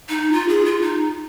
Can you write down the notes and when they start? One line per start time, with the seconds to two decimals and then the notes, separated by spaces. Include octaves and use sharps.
0.09 D#4
0.32 F4
0.48 G#4
0.65 F4
0.82 D#4